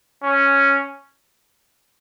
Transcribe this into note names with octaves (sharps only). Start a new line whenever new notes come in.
C#4